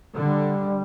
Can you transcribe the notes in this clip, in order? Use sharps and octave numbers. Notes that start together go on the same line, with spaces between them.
D3 G3